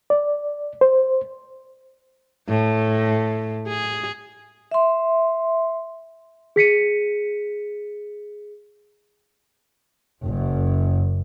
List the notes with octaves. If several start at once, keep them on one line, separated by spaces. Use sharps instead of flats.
D5
C5
A2
G#4
E5 C6
G#4 B6 C#7 D#7
F#1 F#2